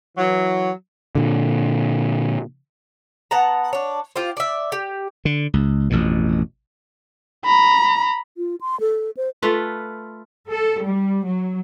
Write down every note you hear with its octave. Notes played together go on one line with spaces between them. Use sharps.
E3 F#3
A#2 D3
B3 F#5 A5 A#5
D4 C#5
F4 G4 C5
D5 E5
G4
D3
C#2
A1 F2 B2
A#5 B5
F4
C6
A4
C5
A3 F4 B4
A4
G3
F#3